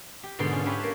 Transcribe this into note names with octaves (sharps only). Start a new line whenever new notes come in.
G4
G#2 B2 D3 A4 D5 C6
C#4 F4 G#4
C#4 D4 E4 G4 B4 C#5
A#3 A5